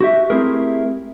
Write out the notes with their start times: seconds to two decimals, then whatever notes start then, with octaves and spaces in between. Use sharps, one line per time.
0.01 F#4 G4 E5
0.30 A3 C4 E4 G4 G#4 A#4